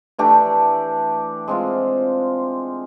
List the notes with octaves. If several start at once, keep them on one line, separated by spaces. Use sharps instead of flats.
E3 A3 D4 G4
G#3 C4 F4